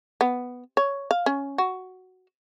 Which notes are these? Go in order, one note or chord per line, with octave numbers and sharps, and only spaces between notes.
B3
C#5
F5
C#4
F#4